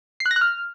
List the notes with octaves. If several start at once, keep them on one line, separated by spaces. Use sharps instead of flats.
C7
F#6
A#6
F#6
F6